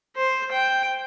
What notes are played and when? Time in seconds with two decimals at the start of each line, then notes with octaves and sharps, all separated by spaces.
0.16 C5
0.51 G5